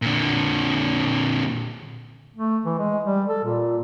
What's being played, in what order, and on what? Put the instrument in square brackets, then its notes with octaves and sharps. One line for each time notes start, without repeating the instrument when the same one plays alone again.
[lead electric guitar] A#2 D3
[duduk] A3
E3
G#3
G3
A4
A#2